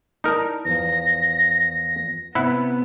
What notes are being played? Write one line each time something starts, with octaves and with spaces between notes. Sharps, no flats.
D#4 E4 A#4 D5 A5
E2 F3 A#6
C3 B3 E4 F#5